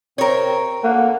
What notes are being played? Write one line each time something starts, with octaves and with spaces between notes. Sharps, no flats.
C3 C4 A#4 C#5
D2 A#3 A4 F#5